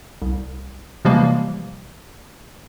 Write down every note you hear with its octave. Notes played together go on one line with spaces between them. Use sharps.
C2
C3 E3 F3 G3 G#3 A#3